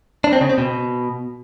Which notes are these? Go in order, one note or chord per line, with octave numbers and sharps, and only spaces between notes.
D4
C4
C#3
C4
B2